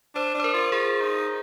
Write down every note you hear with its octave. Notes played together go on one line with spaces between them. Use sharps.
D4 C5
D4
C5
A#4
F4
F4 G#4
D#4